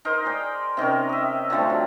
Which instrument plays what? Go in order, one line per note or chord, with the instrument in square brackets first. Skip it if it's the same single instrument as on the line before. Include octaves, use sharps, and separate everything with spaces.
[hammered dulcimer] D#4 A#4 C5
G#4 D5 G5
C3 D#3 C#4 A#4
D#5 E5
D3 F3 G3 A3
F#3